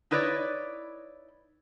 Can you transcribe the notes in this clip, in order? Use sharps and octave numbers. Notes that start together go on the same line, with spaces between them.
D#4 E4 B4 C#5 D5